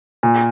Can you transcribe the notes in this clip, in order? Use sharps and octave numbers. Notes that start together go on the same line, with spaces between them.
A#2